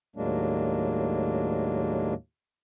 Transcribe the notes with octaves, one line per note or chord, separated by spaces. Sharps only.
D#2 A2 F#3 G#3 A#3 D4